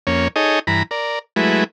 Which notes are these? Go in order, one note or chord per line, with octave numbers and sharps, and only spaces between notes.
F2 A#3 C#4 C#5
D#4 G#4 A4 C#5 D#5
G2 E3 A#5 B5
A#4 D5
F#3 G#3 A3 E4 B4